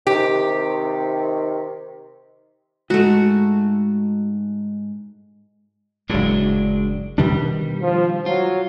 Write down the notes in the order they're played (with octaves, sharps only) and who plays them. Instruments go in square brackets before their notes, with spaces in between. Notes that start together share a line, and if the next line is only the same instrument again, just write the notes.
[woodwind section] C3 D#3 [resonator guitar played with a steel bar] G4
[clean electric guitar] G#2 [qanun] A3 F#4
[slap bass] F#1 A2 [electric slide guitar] F#3 G#3 D4
[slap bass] B2 D#3 D4 [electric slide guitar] G3
[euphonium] F3
[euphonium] F#3 [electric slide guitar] F4